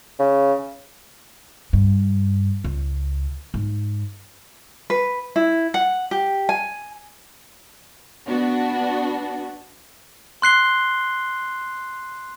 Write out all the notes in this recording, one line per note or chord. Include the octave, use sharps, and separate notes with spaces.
C#3
G2
C#2
G#2
B4
E4
F#5
G4
G#5
B3 D4 F#4
C6 F#6 C7 G7